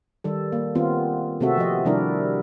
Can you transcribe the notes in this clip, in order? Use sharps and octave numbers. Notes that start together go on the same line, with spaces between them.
D#3 G3 A4
A#3
D#3 B3 C4 F4
C3 A3 C4 F#4 A4 E5
F3 D#5
C3 D#3 G3 D4 E4 A#4